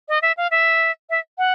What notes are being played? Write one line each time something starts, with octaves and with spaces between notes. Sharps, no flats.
D#5
E5
F5
E5
E5
F#5